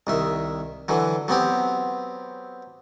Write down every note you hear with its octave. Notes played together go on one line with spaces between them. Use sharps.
C2 D#3 E5
D3 E3 F#3
F#3 B3 C4 G4